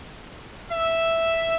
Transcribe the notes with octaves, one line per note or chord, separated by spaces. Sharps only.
E5